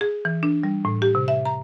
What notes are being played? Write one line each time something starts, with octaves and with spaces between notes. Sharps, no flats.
G#4
E3
D4
G3
A2
G4
C3
E5
A#5